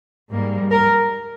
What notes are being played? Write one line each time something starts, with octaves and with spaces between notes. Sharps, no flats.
G#2 G3 A#3
A#4